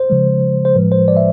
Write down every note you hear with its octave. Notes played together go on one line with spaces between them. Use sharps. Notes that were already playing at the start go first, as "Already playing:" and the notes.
Already playing: C5
C#3 F3 G#3
C5
A2 F3 G#3 B4
C5
D5
E5